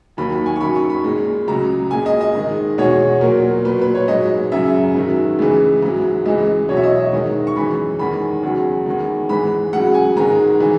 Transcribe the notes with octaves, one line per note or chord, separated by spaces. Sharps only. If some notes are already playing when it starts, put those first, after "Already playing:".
D#2 D#3 F#3 B5
B5
G#5
C#6
F#2 D#3 F#3 B5
C#6
B5
A#2 G#3
C#2 C#3 F#3 A#5
A#2 G#3 G#5
D#5
D#5
G#2 D#3 G#3
E2 B2 G#3 C#5
A#2 F#3 A#4
A#2 F#3 B4
B4
C#5
G#2 F#3 D#5
F#2 C#3 F#3 E5
G#2 D#3 F#3
C#2 C#3 E3 G#3
G#2 F#3
C#2 C#3 E3 G#3 D#5
E2 B2 F#3 C#5
E5
D#5
D#5
G#2 D#3 G#3
C#6
F#2 E3 G#3 B5
E2 D#3 G#3 B5
E2 C#3 F#3
E2 D#3 G#3
G#2 E3 G#3 B5
C#2 C#3 F#3 F#5
G#5
G#2 D#3 G#3 A#5
E3 G#3